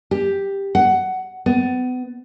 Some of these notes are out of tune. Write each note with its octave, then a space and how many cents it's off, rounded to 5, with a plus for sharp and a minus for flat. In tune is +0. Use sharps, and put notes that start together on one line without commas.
G4 +10
F#5 +15
B3 +30